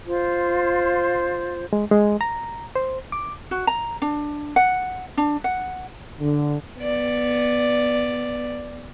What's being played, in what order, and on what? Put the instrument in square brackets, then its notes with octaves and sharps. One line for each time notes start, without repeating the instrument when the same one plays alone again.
[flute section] F4 C5
[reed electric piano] G#3
G#3
A#5
C5
D6
[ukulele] F#4
A#5
D4
F#5
D4
F#5
[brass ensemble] D3
[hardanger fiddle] B3 D5